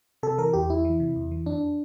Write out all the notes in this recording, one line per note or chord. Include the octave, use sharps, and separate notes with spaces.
C3 A4
E3 A#4
E2 G4
E2 E4
E3
C3
E2
E3
F2 D4